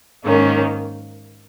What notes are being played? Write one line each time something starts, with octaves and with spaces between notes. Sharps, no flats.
G#2 D#3 A#3 C#4